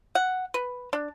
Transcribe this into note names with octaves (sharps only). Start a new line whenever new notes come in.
F#5
B4
D4